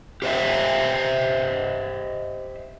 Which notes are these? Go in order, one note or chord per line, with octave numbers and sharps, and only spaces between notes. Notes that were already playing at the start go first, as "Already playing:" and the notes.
G4 C5 D#5 E5